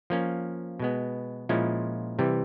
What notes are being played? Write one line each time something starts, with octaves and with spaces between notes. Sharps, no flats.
F3 A#3 C#4
B2 G#3 B3
A#2 F3 G#3 C#4 E4
C3 E3 G3